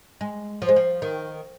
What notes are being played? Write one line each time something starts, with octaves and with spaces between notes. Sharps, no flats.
G#3
F3
G#3
F3
D#3